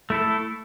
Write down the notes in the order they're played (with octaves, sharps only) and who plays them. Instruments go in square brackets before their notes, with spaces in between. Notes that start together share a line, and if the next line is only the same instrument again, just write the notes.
[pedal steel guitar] A3 E4 A4